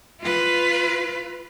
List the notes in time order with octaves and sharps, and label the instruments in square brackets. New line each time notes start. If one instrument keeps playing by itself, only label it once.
[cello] F4 B4